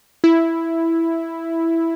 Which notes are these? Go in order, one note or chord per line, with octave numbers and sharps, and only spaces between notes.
E4